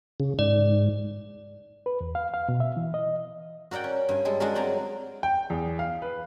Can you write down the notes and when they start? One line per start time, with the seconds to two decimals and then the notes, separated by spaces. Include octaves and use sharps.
0.20 C#3
0.39 G#2 D5
1.86 B4
2.01 E2
2.15 F5
2.34 F5
2.49 B2
2.60 E5
2.77 E3
2.94 D#5
3.71 F#4 A#4 D5 F#5 G5
3.84 C#4
4.09 G2 G#5
4.25 G3 G#3 A4
4.40 G#3 D4 F#4 A4 A#4
4.55 F#3 C4 D5 G#5 A#5
5.23 G5
5.50 E2
5.79 F5
6.02 B4